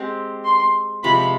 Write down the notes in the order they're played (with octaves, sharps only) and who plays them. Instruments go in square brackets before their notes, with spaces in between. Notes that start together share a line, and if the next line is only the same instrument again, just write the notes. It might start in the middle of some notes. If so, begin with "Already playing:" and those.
Already playing: [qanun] G#3 C4 G4
[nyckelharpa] C6
[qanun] C3 F3 G#3 [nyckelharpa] B5